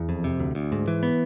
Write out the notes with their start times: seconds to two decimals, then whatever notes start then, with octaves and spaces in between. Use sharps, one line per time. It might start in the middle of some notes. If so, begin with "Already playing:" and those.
Already playing: E2
0.09 F2
0.24 C3
0.40 D2
0.55 D2
0.72 G#2
0.88 E3
1.03 B3